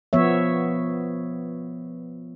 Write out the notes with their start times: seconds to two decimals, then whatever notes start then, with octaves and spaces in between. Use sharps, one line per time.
0.13 F3 B3 C#5 E5